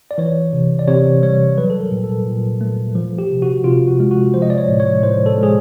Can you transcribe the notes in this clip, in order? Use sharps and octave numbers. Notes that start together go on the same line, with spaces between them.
D5
E3 C#5
C3
D5
C3 C#5
G3 C#5
F#3 B4
A4
A#4
A#2
A4
A#2
A3
F3
G4
C3
F#4
C3 F4
F#4
G#3
F#4
F3 C5
D#5
D5
C#5
A2
C#5
A2 C5
A4
G#3 G#4